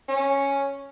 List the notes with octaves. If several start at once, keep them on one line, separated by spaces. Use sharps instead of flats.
C#4